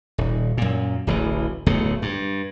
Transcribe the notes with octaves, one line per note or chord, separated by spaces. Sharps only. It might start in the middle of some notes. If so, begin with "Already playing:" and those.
D#1
F#2 A#2
D1 A1 E3
D1 B1 B2 A3
G2